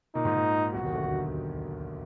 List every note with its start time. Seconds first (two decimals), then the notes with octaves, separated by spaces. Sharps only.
0.15 A#2 D#4
0.25 G#2
0.35 A#2
0.74 B1 B2 F#4
0.83 D#2 D#3
0.93 D2 D3
1.04 D3